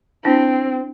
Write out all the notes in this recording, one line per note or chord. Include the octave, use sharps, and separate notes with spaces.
C4 D4 E4